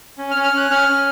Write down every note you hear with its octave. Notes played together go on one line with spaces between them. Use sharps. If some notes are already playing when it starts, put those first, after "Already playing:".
C#4
F6
C#4
F6
C#4 F#6
C#4 F6
C#4